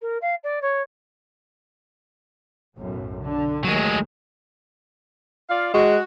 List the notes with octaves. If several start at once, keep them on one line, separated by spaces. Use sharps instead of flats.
A#4
F5
D5
C#5
B1 F#2 A2
D3
D#2 D#3 F#3 G#3 A3
F4 D5 F5
G#3 F#4